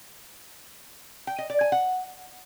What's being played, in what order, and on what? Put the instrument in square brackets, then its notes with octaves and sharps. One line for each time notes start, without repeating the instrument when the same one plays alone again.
[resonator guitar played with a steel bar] G5
D#5
D5
G#5
F#5